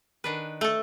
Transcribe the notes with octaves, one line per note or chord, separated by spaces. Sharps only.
D#3 D4 B4
A3 A4